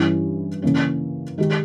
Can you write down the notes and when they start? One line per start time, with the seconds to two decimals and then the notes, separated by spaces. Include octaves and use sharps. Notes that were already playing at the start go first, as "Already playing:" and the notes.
Already playing: G2 E3 G3 C#4 E4
0.62 C#3 E3 A#3 C#4
1.38 D#3 G#3 D#4 G4